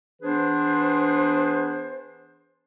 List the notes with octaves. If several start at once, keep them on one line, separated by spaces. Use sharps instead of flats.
E3 B3 D4 G#4 B4 C5